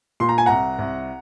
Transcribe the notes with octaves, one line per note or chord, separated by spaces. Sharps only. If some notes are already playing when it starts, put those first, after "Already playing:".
A#2 C6
A#5
G#5
C2 F#5 A#5
C2